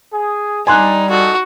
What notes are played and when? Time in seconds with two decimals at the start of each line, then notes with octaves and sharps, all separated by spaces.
0.13 G#4
0.67 G3 D4 D#4 G#5 C6 F#6
1.10 A#2 D#4 F#4 A4